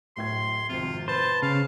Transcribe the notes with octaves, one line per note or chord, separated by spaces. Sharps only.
D1 A2 C6 G#6
G#1 F2 C3 F4
B4 C5 A5
C#3 F5